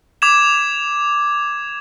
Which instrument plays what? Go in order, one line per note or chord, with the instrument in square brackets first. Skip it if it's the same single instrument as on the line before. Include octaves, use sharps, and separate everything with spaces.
[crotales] D6 G#6 E7